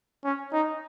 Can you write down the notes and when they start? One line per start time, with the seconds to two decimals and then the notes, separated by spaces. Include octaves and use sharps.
0.24 C#4
0.53 D#4